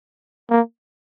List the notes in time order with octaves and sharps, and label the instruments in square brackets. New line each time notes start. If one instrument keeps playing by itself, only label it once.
[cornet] A#3